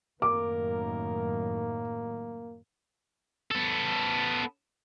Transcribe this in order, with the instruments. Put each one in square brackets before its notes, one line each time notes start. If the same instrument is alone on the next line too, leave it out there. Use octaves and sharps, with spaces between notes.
[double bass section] F#2 A2 D#3 [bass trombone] A#3 [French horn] A#4 [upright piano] D6
[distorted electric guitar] B3 A4